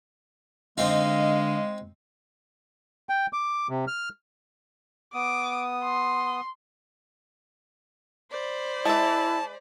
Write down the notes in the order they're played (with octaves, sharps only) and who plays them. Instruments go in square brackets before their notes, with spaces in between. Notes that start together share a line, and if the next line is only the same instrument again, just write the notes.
[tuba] D3 [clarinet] G#3 [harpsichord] C4 D#4 [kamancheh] D#5 F5
[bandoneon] G5
D6
C3
F6
[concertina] B3 D#6 [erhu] D6
[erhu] C6
[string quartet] C5 D5 B5
[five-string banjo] G#3 E5 [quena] E4 [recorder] A5